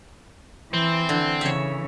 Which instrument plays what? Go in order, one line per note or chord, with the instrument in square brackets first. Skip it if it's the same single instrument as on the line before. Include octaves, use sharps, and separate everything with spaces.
[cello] E3 [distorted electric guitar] C4
[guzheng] D3
[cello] C#3 E3 [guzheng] C#5 E5